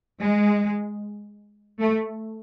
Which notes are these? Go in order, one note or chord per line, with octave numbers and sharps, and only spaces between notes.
G#3
A3